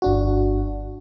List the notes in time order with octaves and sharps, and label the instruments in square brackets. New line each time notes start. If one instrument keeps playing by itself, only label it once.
[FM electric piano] G1 D4 F#4